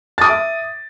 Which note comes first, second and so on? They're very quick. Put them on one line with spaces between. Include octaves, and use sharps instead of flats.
A6 D#6 D6 E5